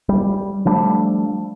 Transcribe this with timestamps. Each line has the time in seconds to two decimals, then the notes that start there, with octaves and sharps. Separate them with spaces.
0.09 G3
0.65 F3 G3 A3 D4